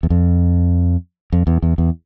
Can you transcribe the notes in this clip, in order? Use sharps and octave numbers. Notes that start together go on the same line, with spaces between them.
E2
F2
F2
E2
E2
E2